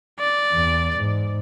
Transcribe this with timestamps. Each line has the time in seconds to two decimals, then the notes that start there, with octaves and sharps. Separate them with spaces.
0.20 D5
0.54 E2
0.98 G#2